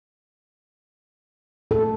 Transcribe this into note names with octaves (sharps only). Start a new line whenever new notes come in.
A4